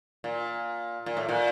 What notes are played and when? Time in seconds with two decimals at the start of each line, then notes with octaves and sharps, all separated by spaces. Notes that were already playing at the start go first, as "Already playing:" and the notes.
0.24 A#2
1.06 A#2
1.17 A2
1.29 A#2